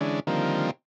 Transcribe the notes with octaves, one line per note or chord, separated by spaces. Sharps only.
D3 E3 G#3 C#4 D4
D3 D#3 F3 G3 A#3 C4